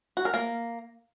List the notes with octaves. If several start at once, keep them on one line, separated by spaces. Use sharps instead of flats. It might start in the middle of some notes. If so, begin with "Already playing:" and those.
F#4
A#4
A#3